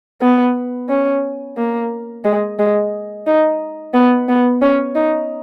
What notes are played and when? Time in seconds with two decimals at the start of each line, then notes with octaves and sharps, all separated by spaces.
0.21 B3
0.89 C#4
1.57 A#3
2.24 G#3
2.59 G#3
3.27 D#4
3.94 B3
4.29 B3
4.62 C#4
4.95 D#4